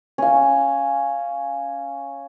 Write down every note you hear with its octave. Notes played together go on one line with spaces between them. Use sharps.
C#4 F5